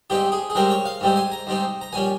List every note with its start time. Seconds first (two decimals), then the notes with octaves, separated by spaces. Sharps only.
0.10 G#2 G3 C4 D#4 G4
0.32 G#4
0.50 G#4
0.55 G#2 G3 C4 D#4 A#4
0.70 C#5
0.85 F5
1.01 G#2 G3 C4 D#4
1.16 G#5
1.32 A#5
1.47 G#2 G3 C4 D#4
1.81 A#5
1.93 A#1 G3 C#4 G#5